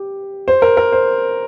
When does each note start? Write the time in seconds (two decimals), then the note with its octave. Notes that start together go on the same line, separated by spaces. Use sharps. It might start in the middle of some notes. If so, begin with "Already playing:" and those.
Already playing: G4
0.48 C5
0.62 A#4
0.77 A#4
0.92 C5